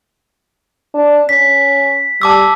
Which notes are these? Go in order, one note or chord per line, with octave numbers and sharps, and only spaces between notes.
D4
C#4 B6
G3 A5 D6 E6